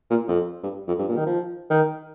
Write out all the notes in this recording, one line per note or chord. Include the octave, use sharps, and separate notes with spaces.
A#2
F2
G2
F2
G2
A#2
D#3
F3
D#3